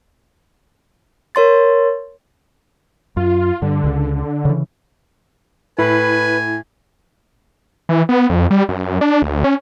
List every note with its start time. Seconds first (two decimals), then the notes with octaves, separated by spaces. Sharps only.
1.35 A#4 C#5 C6 A6
3.17 F#2 F4
3.62 G2 D3
3.84 C#2 C#3
4.45 C#3 E3
5.79 A2 E4 B4 G#5
7.89 E3
8.09 B3
8.30 F2
8.51 G3
8.69 F#2
9.01 D4
9.22 D2
9.44 C#4